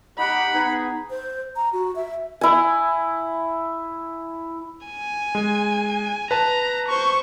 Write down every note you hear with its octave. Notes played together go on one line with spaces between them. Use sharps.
D#4 G4 F#5 B5
B3 D#4 G#4
C5
A#5
F#4
E5
E4 G#5
G#5
G#3
B4 A5 A#5
C5 C#6